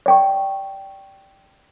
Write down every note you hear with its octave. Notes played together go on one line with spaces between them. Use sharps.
D5 G5 C#6